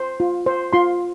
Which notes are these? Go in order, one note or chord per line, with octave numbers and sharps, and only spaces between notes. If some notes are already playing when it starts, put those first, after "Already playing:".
Already playing: C5
F4
C5
F4 C6